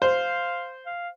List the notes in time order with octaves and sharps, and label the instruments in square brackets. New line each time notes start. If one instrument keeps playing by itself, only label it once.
[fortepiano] C5 [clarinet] F5
[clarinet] F5